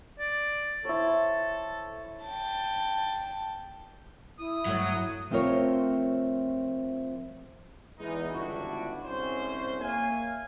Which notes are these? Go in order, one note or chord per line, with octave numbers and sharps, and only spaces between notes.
D5
E4 A4 C5 C#5
G5 A5
E4 D#6
G2 F#3 A3 C#5
F3 A3 C4 F4 A#4 C#5
E2 E3 G#3 D#4
G1 C#2 D4 E4 F#4
C2 G#2 C#4 C5
A#3 C#5 E5 F5 G#5